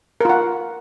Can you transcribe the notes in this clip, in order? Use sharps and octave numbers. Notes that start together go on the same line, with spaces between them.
F4 A#4 F#5